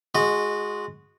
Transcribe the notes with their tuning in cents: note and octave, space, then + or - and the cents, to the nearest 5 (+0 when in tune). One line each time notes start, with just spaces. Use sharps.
G#3 +0 F#4 -10 D#5 -25